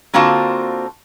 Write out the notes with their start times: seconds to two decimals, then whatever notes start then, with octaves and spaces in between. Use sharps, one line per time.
0.14 D3 A#3 C4 F4 F#4 A5